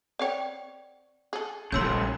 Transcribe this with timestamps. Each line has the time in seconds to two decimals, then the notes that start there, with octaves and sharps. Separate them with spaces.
0.19 C4 C#5 D5 F#5 G5
1.33 G#4 A4
1.72 A#1 A2 C#3 G3 C6 E6 G6